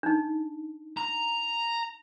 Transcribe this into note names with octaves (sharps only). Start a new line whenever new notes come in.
D4 D#4
A#5